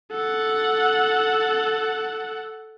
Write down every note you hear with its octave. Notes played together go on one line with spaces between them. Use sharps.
A4 F#5